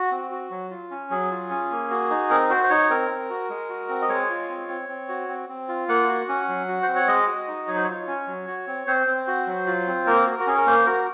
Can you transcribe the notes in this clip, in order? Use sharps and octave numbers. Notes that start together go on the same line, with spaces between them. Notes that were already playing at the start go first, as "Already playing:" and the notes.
Already playing: F#4
C4
F#4
F#3
F4
C#4
F#3 G#4
F4
C#4
A#3
F#4
D#4
C4 A#4
F#4 C5
C5
D#4 C#5
C4 A#4
C4
F#4
G#3
F#4
C4
D#5
G#3 C#5
F4
C4
C4
C4
F#4
C4
C4
F4
A#3 F#5
F#4
C#4
F#3
F#4
C5
C4
C#5
G#3 D#5
F#4
D#4
F#3 C#5
C5
F4 C#5
C#4
F#3
F#4
C4
C4 C5
C4
F#4
F#3
F4
C4
A#3 A#4
F#4
F#4
C#4 G#4
A#4
A#3 C5
F#4 A#4